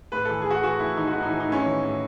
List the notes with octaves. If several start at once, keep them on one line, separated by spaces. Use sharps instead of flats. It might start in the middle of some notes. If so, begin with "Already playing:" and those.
A2 B4
A4
E3
G#4
E3 F#4
E3 F#4
A2 E4
E3 D#4
F#4
A2 E4
D#4
E4
E3
D#4
A2 C#4
E3
A2